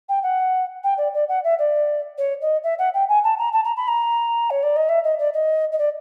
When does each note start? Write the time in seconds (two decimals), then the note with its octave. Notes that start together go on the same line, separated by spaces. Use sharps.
0.09 G5
0.23 F#5
0.83 G5
0.97 D5
1.13 D5
1.28 F#5
1.44 E5
1.58 D5
2.18 C#5
2.41 D#5
2.63 E5
2.78 F#5
2.94 G5
3.08 G#5
3.23 A5
3.38 A#5
3.53 A5
3.64 A#5
3.76 B5
3.87 A#5
4.50 C#5
4.62 D5
4.76 D#5
4.89 E5
5.04 D#5
5.19 D5
5.33 D#5
5.72 D#5
5.78 D5